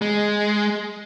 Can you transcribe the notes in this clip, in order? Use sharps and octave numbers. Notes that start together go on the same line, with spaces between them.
G#3